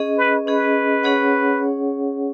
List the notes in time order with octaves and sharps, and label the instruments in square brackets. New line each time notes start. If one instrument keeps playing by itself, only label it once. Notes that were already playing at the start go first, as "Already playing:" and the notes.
Already playing: [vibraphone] C#4 G#4 D#5
[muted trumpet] B4
[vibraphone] C#4 G#4 D#5 [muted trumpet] B4
[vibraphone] C#4 G#4 C#5 F#5